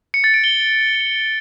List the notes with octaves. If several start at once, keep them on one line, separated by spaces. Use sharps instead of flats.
C#7
A6
D7
G7